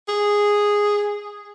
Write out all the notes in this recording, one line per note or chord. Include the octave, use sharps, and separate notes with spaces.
G#4